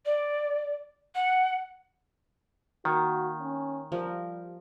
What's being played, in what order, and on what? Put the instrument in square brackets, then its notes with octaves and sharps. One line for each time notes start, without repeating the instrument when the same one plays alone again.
[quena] D5
F#5
[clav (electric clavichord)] D#3 [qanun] A#3 [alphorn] F#4
[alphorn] C#4
[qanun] F3 A#4 [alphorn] G3